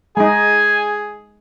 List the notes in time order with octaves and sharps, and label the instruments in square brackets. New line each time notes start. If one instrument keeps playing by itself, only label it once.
[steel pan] G#3 D#4 [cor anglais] G#4 [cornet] G#5